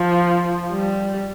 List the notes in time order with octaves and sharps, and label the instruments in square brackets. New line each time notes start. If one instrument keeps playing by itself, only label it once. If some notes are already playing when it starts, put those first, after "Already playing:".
Already playing: [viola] F3
G3